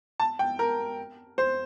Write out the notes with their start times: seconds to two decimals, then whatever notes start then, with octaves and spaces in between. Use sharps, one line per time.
0.20 A5
0.39 G5
0.59 A#4
1.38 C5